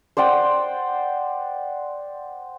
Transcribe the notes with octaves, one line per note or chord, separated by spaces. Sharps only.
C5 D5 F#5 G5